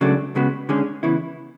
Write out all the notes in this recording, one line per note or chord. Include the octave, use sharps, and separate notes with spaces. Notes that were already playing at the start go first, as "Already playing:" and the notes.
C#2 C#3 F#3 A3 D4
C#2 C#3 G#3 B3 F#4
D3 G#3 C#4 G#4
C#3 E3 B3 E4